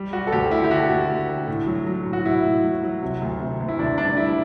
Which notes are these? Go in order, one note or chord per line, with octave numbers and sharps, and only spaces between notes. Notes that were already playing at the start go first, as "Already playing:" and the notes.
Already playing: G3
G3 F#4
A4
D2 G4
D2 E4
G4
D3 F#4
D2
D2
D3
A2
F#3
F#3
A2
F#4
A2 E4
A2
F#3
F#3
C3
D2
C3
D2
E4
D2 D4
G3 D4
G3 E4